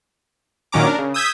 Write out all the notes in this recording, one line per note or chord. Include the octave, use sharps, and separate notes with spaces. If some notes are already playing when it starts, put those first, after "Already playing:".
A#2 D#3 F#3 C#4 A#5 D6
D4 A#4
C#3
D#6 E6 G6 G#6 B6